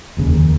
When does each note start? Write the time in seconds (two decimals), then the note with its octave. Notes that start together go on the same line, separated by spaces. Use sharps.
0.17 F1 D#2 C#3
0.34 D#3